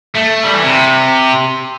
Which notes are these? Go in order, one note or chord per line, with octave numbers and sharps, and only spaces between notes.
A3
G3
E3
C3